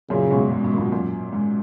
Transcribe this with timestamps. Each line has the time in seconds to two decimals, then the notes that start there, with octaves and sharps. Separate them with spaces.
0.10 F#2 A#2 C#3
0.31 G#2 B2
0.52 G#2
0.64 G#2
0.74 A#2
0.78 G#2 B2
0.92 F#2 A#2
1.33 G#2